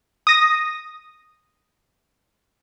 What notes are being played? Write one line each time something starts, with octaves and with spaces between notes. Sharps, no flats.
D#6 A#6